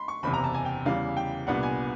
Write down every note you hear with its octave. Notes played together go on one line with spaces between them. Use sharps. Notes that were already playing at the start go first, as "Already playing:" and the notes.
Already playing: B5 C6
C#6
F#1 E2 C3 B5
A#5
A5
G#5
G5
E2 C#3 E3 G3 F5
G5
C2 A#2 G3 B3 D4 F#5
G#5